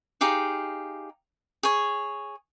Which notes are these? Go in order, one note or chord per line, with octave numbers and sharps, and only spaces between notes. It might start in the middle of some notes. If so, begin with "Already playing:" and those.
D#4 G4 G#4 F5
G#4 C#5